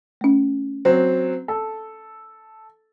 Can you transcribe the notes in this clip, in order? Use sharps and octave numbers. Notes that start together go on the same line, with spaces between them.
A3 C#4
F#3 C4
A4